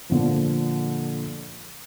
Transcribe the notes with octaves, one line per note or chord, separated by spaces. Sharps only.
A#2 D3 F3